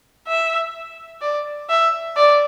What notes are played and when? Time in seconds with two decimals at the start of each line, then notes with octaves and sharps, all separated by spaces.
0.27 E5
1.21 D5
1.69 E5
2.16 D5